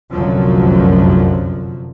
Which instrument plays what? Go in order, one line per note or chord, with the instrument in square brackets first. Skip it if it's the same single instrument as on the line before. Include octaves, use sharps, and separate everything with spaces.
[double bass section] F1 C2 F#2 D3 F3 F#3